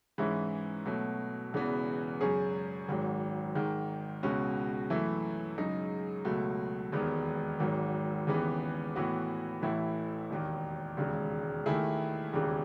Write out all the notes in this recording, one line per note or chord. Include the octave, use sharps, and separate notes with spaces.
G#2 E3 G#3 C#4 E4
B2 F#3 A3
E1 E2 C#3 E3 B3
F#2 C#3 G#3 C#4 G#4
G#1 G#2 F#3
G#2 D#3 G#3
C#2 B2 G#3 C#4 F#4
F#2 E3 A3 E4
F#2 C#3 G#3 D#4
C#2 B2 F#3 A3
E1 D#2 D#3 G#3 B3
G#1 G#2 F#3
D#2 C#3 E3 G#3 B3
A2 E3 B3 F#4
A1 A2 E3 A3 E4
E1 D#2 D#3
E1 D#2 C#3 G#3
D#2 D#3 A3 E4 G#4
E1 D#2 C#3 E3